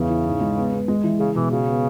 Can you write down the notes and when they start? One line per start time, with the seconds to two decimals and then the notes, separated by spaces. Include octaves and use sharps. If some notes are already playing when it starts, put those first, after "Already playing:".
Already playing: E2 C#3 B3
0.09 E4
0.25 G#2
0.40 G#3
0.57 B3
0.72 B3
0.88 G#3
1.04 E3
1.19 C#3 G#4
1.35 B2 E3
1.51 C#3 F#4
1.67 B3